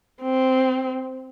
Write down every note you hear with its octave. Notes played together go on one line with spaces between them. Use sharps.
C4